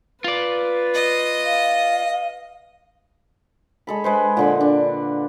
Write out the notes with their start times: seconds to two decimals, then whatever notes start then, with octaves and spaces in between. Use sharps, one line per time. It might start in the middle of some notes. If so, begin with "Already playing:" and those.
0.24 F4 B4 D5
0.94 D#5
1.44 F5
3.87 G#3 A4 B5
4.04 G#3 B4 C5
4.37 A#2 D3 B4
4.61 D4